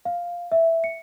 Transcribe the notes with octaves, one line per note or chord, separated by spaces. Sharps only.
F5
E5
C#7